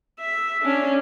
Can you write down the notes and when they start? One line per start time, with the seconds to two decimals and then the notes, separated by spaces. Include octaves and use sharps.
0.20 E5
0.65 C#4 D4